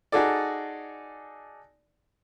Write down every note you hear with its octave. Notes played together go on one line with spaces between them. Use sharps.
D#4 F#4 G#4 A4 D5